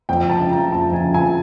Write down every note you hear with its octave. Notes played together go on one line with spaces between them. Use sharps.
F2 G5
F2 A5
C#3
A#5
F3
F2 A5
F2 G#5
C#3
G#5
F3